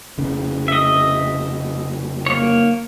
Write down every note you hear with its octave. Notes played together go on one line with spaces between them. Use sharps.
F1 C#3
D#5 E5
A#3 C#5